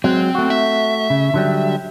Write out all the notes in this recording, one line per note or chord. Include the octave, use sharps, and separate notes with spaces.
F#3 G#3 C4
A3 F#4
E5
C#3
D3 F#3 G3